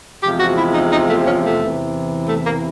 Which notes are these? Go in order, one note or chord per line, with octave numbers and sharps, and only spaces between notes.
E2 C3 F3 G#3 G4
F#4
E4
D#4
D#4
A3
C#4
A3
E2 C3 E3
A3
A#3